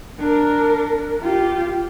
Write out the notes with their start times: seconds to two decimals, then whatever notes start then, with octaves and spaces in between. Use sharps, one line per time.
0.19 D4 A#4
1.21 F4 G4